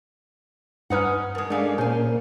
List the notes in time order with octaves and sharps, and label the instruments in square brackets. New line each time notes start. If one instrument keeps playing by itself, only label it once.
[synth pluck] G2 B4 F6 [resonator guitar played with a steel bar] C#4 D#4 F#5
[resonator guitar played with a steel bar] B2 G#3 [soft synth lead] A#4
[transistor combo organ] G#3 D4 [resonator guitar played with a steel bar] A3 C#4 F5
[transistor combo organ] A#2 [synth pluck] C#4 [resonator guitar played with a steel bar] C5 G#5